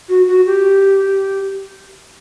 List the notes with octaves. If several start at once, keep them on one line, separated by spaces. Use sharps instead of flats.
F#4
F#4
G4